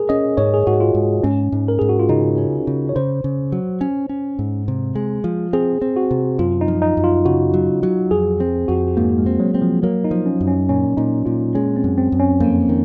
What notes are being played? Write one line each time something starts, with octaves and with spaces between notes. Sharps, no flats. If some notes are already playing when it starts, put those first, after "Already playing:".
Already playing: G#4 A#4
C#4 D#5
G#2 C#5
G#4
G#2 F#4
F4
G#2
G#2 C#4
G#2
A#4
G#2 G#4
F#4
F4
C#3 D#4
C#4
C#3
C#5
C#3 C5
C#3
F#3
C#4
C#4
G#2
C3
G#3
F3
C4 G#4
C4
F#4
C3
F#2 F4
D#4
F3
D#4
F#2
F4
C#3 F#4
F#3
F#3
F2 G#4
C4
F2 F#4
G#2 A#3
G#3
C4
F#3
C4
F3
F#3 A#3
D#4
F3
C#4
F#2
C#4
A#2 C#4
A#2 D#4
A#2 F4
G#3 C#4
C4
F#2
C4
F#2
C#4
F2 A#3
D#3